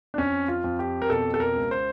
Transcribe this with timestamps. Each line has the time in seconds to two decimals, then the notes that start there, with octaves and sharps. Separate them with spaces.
0.14 D4
0.18 F2 C#4
0.48 F4
0.64 F2
0.79 G4
1.02 A#4
1.10 B2 A4
1.34 A4
1.40 A#4
1.55 C#2
1.71 C5